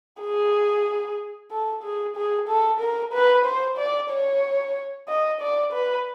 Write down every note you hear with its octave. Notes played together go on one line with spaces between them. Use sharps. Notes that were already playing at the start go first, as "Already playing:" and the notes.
G#4
A4
G#4
G#4
A4
A#4
B4
C5
D5
C#5
D#5
D5
B4